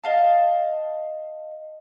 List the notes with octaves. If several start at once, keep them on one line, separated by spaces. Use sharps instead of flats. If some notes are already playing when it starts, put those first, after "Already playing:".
D#5 F5 A5